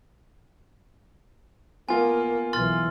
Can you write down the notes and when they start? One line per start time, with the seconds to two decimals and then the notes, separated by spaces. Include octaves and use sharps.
1.89 A#3 B3 F4 G#5
2.53 B1 E3 C6 F6 A6